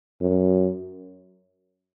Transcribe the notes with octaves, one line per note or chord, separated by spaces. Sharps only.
F#2